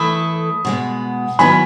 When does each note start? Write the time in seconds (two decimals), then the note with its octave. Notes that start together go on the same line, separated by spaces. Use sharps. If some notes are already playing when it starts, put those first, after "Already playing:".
Already playing: E3 A3 E4 A4 B5 D#6
0.65 B2 G#3 B3
1.39 D#3 F#3 B3 E4 B4 G#5 B5